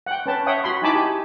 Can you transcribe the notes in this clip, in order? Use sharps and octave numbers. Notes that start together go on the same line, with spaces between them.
F#5 G5
C#4 B4 G5 A5
C#5 E5 F#5 G5 D#6
F#4 B5 C6
D#4 E4 G#5 A5 B5 D6
G4 G#5